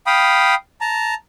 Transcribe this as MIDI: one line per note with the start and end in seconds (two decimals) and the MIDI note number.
0.06 0.55 77
0.06 0.55 79
0.06 0.55 83
0.06 0.55 87
0.81 1.14 81
0.81 1.14 82